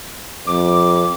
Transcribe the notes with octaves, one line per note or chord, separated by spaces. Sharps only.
F2 D6